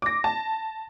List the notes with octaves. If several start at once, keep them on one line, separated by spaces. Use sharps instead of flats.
D6 A#6
A5